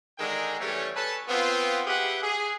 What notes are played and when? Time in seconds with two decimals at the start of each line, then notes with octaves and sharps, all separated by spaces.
0.18 D3 D#3 G#3 G#4 G5 A#5
0.60 A2 E3 G3 A3 C#4 C#5
0.95 A4 B4 C#5 G#5 A5
1.28 B3 C4 F4
1.86 G4 G#4 B4 E5 F#5
2.22 G#4